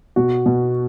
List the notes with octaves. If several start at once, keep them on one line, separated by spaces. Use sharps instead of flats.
B2 F#4
B2